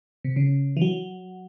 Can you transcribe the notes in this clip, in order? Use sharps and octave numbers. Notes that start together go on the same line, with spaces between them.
C3
C#3
E3
F#3